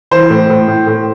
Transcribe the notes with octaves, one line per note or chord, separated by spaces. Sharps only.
E3 C5
A2
A2
A2
A2